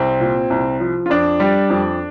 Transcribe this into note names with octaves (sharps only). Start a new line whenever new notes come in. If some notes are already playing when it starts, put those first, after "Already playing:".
Already playing: C2 C4
A#2
C2
F3
F4
F2 D4
G3
F2